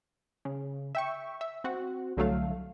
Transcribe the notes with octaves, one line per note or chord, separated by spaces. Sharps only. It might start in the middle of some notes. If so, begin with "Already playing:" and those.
C#3
E5 G5 C#6
E5
C4 F#4
C2 D3 F#3 A3 F5